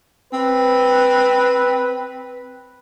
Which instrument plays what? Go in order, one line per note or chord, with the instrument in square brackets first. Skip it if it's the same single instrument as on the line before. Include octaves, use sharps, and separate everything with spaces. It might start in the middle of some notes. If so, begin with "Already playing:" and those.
[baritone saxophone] C4 [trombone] B4